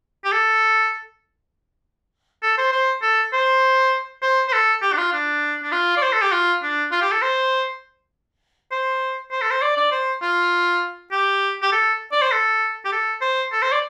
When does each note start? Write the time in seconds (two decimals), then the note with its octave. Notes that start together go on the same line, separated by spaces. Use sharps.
0.24 G4
0.32 A4
2.43 A4
2.58 C5
2.72 C5
3.02 A4
3.33 C5
4.22 C5
4.48 C5
4.53 A4
4.82 G4
4.92 D4
4.97 F4
5.12 D4
5.63 D4
5.72 F4
5.97 D5
6.02 C5
6.12 A4
6.22 G4
6.32 F4
6.62 D4
6.91 F4
7.01 G4
7.11 A4
7.22 C5
8.71 C5
9.31 C5
9.41 A4
9.51 C5
9.62 D5
9.77 D5
9.92 C5
10.22 F4
11.11 G4
11.62 G4
11.72 A4
12.12 D5
12.21 C5
12.31 A4
12.85 G4
12.92 A4
13.21 C5
13.52 A4
13.62 C5
13.72 D5